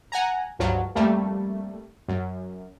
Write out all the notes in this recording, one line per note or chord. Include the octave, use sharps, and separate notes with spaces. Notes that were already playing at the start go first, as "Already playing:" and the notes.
F#5 G#5 A#5
C#2 G2 F3 F#3
F2 G3 A3 A#3
F#2